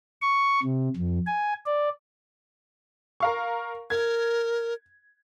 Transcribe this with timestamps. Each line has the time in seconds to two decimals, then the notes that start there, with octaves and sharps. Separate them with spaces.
0.22 C#6
0.63 C3
0.97 F2
1.27 G#5
1.66 D5
3.20 A#4 F5 C#6
3.90 A#4 G#6